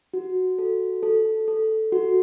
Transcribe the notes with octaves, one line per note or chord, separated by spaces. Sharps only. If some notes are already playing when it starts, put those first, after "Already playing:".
F#4
A4
A4
A4
F#4